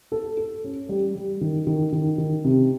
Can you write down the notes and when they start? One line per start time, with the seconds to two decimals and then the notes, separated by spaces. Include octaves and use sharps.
0.12 A4
0.37 A4
0.64 C#4
0.89 G3
1.16 G3
1.41 D#3
1.67 D#3
1.92 D#3
2.18 D#3
2.44 C3